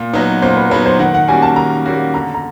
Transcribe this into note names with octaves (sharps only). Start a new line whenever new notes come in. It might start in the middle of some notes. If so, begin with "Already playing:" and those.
Already playing: A#2
F#3 B3 D#4
A#2 C5
B4
F#3 B3 D#4 B4
C5
D#3 F#5
F#5
G3 A#3 C#4 F#4 G#5
A5
D#3 A#5
G3 A#3 C#4 F#4
D3 A#5
A#5